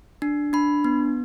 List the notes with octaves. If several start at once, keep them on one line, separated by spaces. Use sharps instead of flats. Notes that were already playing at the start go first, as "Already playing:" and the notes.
D4
D4 B5
B3